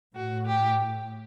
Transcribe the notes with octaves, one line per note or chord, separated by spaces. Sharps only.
A2 F#4
G4